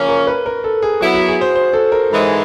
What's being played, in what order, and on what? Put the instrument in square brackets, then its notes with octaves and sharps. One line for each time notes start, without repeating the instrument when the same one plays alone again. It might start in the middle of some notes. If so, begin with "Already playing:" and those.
Already playing: [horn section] C#3 F3 A#3 C#4
[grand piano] A#4
B4
A#4
A4
G#4
[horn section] F#3 B3 E4 [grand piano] F#4
[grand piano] F#4
G#4
C5
C5
A4
A#4
[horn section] G#2 E3 G#3